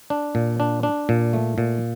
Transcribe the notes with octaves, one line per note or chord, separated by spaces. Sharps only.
D4
A#2
D4
D4
A#2
A3
A#2